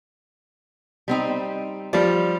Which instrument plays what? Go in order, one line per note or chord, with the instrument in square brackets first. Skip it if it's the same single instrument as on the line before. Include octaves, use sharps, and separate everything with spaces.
[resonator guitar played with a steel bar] G3 C4 D#4
[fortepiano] F3 G3 [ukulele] D5